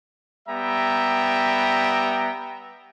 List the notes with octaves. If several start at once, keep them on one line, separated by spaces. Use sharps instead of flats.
G3 B3 E5 G5 A#5